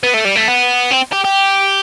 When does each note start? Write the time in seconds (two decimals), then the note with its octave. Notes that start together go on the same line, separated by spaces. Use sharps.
0.03 B3
0.14 A3
0.25 G3
0.35 A3
0.48 B3
0.91 C4
1.13 G4
1.25 G4